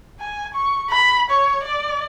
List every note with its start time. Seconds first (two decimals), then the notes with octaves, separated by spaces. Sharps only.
0.20 G#5
0.54 C#6
0.90 B5
1.30 C#5
1.63 D5